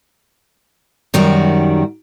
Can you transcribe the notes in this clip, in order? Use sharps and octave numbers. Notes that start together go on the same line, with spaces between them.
F#2 D#3 G3 F#4